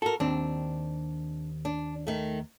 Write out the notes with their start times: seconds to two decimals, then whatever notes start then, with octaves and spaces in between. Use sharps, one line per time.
0.02 F#4 A4 A#4
0.20 D#2 C4 D4
1.65 D4
2.07 D#3 A3